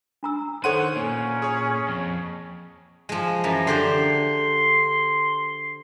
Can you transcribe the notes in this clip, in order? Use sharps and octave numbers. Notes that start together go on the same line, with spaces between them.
D4 A#5 E6
D#3 A4 C5 C#5 F#5 C6 D#7
A#2 C#4
G#4 C#5
F2
F3 G#3
F#2 E3 A#5
D3 G4 C5 C6